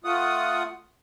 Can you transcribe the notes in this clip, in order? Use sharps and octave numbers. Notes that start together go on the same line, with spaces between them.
A3 F4 F#5 D#6